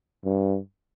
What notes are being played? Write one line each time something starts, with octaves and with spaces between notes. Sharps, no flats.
G2